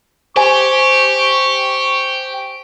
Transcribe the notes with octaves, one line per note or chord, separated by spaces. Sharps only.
G4 C5 G#5 C#6